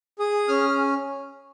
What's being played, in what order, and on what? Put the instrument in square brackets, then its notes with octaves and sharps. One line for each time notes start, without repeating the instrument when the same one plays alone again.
[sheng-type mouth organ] G#4 D#6
C#4 F6